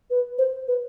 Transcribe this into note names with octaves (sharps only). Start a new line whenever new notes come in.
B4
C5
B4